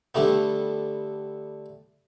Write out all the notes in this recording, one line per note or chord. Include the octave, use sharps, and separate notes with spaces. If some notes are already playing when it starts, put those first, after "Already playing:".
D3 G3 A3 B3